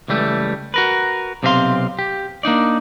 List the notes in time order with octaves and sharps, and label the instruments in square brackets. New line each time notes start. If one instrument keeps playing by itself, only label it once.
[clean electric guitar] C#2 E3 G3 A3
F#4 A#4 B4
B1 C3 C4 C#4 F5 C6
G4
A#3 D4 D#4 D5